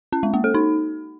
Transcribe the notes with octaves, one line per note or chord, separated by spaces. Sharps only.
C#4
G#3
A#3
A4
D#4